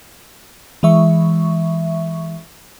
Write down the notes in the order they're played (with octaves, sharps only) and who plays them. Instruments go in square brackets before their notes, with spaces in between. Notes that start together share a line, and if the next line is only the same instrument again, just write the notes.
[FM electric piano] E3 G#3 E5 C#6